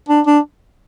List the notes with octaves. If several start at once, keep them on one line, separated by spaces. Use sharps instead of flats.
D4
D4